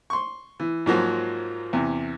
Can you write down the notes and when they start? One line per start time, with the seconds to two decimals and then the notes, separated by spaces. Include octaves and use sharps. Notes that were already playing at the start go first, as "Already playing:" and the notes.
0.10 C6 C#6
0.60 E3
0.86 G#2 F3 F#3 A#3
1.73 E2 C3